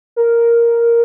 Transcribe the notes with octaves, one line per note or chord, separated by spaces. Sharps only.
A#4